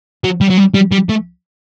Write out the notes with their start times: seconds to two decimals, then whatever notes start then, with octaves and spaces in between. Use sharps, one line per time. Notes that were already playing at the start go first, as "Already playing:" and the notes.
0.24 F#3
0.41 G3
0.50 F#3
0.57 G3
0.74 G3
0.92 G3
1.09 A3